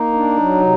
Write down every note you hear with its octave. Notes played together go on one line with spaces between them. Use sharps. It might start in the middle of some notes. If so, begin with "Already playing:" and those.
Already playing: A#3 D#4
D4
F#3
C3